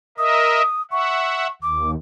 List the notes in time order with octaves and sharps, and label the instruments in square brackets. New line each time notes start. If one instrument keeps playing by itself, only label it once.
[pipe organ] A#4 D#5 E5 [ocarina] D#6
[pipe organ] E5 F#5 [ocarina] C#6
[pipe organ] D#2 [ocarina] D6